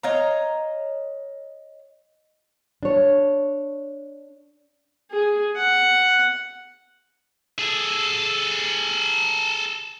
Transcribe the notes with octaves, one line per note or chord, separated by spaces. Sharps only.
C#5 D#5 F5 A#5
D4 C#5
G#4
F#5
G#4 A4